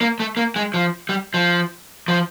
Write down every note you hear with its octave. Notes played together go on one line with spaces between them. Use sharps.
A#3
A3
A#3
G#3
F3
G3
F3
F3